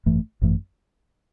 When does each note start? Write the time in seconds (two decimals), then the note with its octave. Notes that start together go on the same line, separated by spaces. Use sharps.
0.06 G#1 F#2 E3 A3
0.42 G#1 F#2 E3 A3